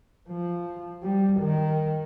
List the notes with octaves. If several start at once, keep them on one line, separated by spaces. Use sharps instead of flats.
F3
G3
D#3